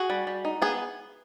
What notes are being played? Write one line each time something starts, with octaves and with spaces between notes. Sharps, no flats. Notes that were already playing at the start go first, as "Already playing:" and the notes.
Already playing: F#4 G#4
G3
G3
D#4
B3 G#4